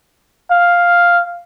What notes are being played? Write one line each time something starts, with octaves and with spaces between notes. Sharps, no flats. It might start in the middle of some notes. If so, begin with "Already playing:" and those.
F5